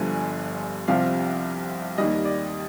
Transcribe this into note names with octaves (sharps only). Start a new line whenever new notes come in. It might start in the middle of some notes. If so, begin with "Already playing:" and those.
Already playing: G1 G2 D3 F3 G#5
C2 C3 F3 F5
D#2 D#3 G3 D#5
D5